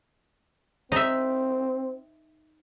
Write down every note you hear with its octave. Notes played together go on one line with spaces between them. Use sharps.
C4 D#4 E5